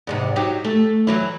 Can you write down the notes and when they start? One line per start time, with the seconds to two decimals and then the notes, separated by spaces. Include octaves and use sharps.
0.07 E2 G#2 C3
0.36 F#3 D#4 G4
0.64 A3
1.07 E3 F#3 E4